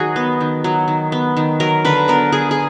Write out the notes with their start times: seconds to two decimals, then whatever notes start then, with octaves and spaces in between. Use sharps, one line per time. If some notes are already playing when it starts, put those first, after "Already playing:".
Already playing: D#3 F#3 F#4 G#4
0.16 B3
0.41 D#3
0.64 F#3
0.88 D#3
1.12 B3
1.37 D#3
1.60 F#3 A#4
1.85 D3 B4
2.08 B3 A#4
2.32 D3 G#4
2.51 G#4